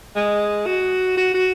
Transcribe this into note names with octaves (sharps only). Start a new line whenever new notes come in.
G#3
F#4
F#4
F#4